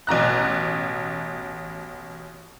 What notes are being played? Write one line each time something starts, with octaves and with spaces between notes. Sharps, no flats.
A1 B2 A#5 F#6